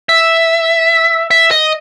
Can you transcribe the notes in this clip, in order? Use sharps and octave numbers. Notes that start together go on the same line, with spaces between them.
E5
E5
D#5